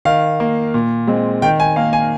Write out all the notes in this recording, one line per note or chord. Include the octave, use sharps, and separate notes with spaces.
D#3 F5
A#3
A#2
G#3 C4
D#3 G5
G#5
A#3 F5
G#5